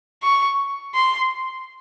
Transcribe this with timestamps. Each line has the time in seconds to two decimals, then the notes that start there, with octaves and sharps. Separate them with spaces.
0.23 C#6
0.95 C6